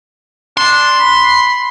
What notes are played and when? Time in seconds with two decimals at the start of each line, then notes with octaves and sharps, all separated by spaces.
0.57 D4 C6
1.00 B5